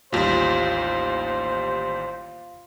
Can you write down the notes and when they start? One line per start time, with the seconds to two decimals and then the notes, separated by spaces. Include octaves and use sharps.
0.12 A1 D#2 G3 F4 C5